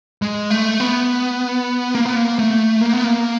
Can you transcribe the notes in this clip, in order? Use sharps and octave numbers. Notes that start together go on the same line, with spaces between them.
G#3
A3
B3
A#3
B3
A#3
A3
A#3
B3
A#3